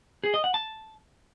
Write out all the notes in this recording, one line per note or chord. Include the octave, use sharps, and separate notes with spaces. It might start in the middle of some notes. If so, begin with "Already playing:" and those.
G#4
D#5
F#5
A5